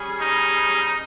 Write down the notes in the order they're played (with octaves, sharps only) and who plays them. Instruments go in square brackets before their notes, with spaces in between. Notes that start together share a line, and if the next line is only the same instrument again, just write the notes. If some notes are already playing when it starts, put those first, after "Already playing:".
Already playing: [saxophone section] G3 C#4 G#4
[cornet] D#4